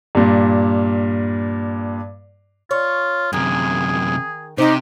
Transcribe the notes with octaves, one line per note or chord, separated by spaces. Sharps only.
G2 A#2
F4 C#5
F#2 C3 D#3 G#4
C3 D#4 G4 C5 G5